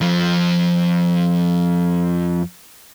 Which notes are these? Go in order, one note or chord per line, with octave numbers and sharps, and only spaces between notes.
F2 F3